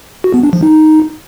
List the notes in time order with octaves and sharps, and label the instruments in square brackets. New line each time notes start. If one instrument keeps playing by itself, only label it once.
[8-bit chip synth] F#4
B3
D4
F3
D#4